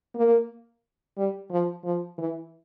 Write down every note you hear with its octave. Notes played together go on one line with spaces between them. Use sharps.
A#3
G3
F3
F3
E3